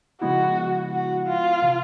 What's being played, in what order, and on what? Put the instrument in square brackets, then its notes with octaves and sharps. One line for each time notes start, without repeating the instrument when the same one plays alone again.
[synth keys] C#3 F3 G#3 B3 E4 [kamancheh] F#4
[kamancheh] F#4
F4
[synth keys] C3 E3